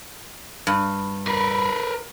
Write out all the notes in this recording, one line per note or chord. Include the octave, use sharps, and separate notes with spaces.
G2
A#4 B4